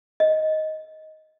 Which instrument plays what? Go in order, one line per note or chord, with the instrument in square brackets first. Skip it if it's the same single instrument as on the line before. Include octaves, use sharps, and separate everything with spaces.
[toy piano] D#5